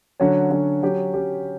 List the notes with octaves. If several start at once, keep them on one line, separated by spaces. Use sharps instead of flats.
D3 F#3 C#4
D3 F#3 C#4
F#3 C#4 G4
F#3 C#4 G4